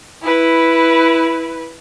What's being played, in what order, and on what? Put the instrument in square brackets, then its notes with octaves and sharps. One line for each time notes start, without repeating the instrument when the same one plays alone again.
[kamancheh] E4 B4